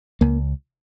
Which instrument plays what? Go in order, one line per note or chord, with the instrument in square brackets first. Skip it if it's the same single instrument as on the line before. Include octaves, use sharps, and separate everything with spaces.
[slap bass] C#2 A#3